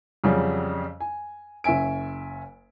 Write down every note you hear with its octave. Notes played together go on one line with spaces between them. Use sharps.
F2 C#3 F#3 G3 C#4
G#5
F#1 C#4 E5 G#5 D7